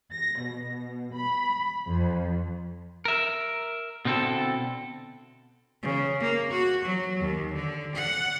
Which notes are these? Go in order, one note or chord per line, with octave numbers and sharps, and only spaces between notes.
A#6
B2
B5
F2
A#4 E5
B2 D3 C4 E4 A4
C#3
A#3
F#4
F#3
D#2
D3
F#5